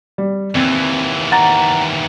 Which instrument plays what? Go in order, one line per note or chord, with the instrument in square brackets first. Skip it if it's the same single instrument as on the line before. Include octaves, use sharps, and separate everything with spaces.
[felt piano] G3
[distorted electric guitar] D#2 E3 [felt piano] C4
[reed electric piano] F#5 A#5 [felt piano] A6